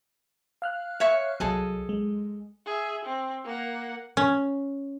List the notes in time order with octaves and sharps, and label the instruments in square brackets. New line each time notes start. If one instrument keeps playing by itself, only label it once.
[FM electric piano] F5 F6 F#6
[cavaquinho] C#5 E5 C#6
[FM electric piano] C2 F#3 [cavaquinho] G#4 A4 D#5
[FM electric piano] G#3
[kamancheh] G#4 E5
C4
A#3 F#5
[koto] C#4